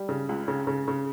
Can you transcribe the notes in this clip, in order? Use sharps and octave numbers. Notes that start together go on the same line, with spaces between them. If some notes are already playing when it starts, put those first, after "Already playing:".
Already playing: G3
C#3
C#2
C#3
C#3
C#3